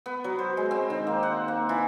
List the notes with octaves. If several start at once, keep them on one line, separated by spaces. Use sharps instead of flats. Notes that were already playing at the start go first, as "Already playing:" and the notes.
B3
F#3
C5
G#3
C4
D#3
A#3
F#5
A#3
E3